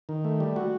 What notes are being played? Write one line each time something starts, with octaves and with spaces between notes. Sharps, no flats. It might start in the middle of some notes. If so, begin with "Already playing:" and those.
D#3
A3
G3
F#4